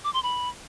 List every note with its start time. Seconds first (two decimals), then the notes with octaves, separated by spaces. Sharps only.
0.04 D6
0.14 C6
0.23 B5